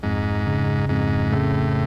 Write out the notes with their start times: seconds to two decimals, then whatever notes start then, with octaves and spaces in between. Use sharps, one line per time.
0.03 F2 G#2
0.46 C#3
0.89 F2 G#2
1.32 A2 C#3